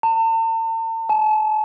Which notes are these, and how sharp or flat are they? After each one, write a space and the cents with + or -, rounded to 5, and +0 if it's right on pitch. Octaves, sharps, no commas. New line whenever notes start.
A5 +45
A5 -40